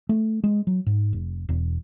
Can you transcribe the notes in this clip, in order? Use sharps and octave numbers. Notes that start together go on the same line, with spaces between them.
A3
G#3
F#3
G#2
F1
E1